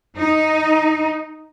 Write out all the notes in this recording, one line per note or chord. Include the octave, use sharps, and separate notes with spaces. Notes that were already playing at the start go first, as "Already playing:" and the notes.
D#4